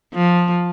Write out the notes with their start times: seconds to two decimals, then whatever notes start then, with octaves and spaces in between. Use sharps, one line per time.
0.14 F3